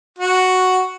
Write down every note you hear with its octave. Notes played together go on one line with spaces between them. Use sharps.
F#4